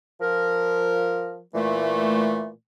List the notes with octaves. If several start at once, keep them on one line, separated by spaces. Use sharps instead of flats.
F3 A#4
A#2 E3 A3